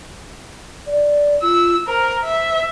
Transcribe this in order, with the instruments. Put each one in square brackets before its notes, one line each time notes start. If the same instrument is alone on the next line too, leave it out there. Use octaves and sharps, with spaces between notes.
[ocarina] D5
[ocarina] F4 [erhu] E6
[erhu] A#4 [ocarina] C5
[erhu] E5